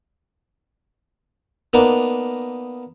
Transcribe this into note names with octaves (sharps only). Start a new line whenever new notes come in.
A#3 B3 D4 D#4